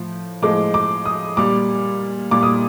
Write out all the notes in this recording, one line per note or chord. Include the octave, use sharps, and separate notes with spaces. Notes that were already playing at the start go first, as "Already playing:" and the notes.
Already playing: A2 F3
A2 F3 G#3 D6
D6
D#6
A#2 G3 D6
A#2 G3 D6
D#6